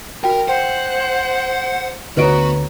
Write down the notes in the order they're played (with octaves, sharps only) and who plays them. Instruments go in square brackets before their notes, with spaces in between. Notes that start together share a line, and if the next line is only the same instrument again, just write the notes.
[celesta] F#4 G5 [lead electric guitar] A#4
[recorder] C5 [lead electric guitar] F#5 [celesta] G5
[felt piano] D2 C#5 A#5 [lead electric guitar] B3 [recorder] F#4 [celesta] B4 D#5 D7